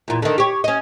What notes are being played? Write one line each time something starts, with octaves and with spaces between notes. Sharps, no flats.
E2 A#2
D3 D#3
G4 C#5
C#4 D#5